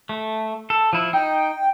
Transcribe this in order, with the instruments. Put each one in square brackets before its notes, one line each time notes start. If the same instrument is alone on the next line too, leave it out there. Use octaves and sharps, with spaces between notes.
[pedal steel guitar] A3
A4
F3 E4
[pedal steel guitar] D#4 [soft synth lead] G5